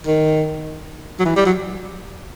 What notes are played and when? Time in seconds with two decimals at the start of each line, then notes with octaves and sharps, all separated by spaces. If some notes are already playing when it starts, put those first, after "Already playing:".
0.07 D#3
1.20 F#3
1.25 E3
1.36 G3
1.45 F#3